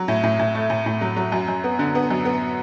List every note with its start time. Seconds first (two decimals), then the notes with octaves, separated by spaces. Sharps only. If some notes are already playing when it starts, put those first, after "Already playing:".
Already playing: F#3
0.08 A2
0.24 A2
0.39 A2
0.55 A3
0.70 A2
0.86 A2
1.01 F#3
1.16 F#3
1.32 F#2
1.48 F#2
1.64 B3
1.79 D3
1.95 B3
2.11 F#2
2.25 B3